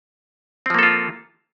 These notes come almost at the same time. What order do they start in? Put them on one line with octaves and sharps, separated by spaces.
C4 F3 A#3 A4 F4